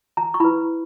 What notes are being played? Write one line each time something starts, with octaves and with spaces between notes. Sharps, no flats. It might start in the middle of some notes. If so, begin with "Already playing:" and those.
A#5
C#6
E4 B4 B5